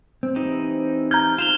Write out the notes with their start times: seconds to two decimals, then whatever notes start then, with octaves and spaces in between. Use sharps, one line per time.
0.23 C4
0.36 E3 D#4 G4
1.11 A#5 F6 G6 G#6
1.38 F4 G#4 F6 E7 F7 G7